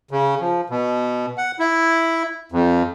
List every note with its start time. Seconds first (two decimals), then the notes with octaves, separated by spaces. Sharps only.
0.11 C#3
0.40 F3
0.70 B2
1.38 F#5
1.59 E4
2.52 F2